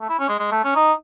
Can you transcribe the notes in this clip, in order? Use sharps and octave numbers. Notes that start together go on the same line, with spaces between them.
A3
E4
C#4
G#3
G#3
A3
C#4
D#4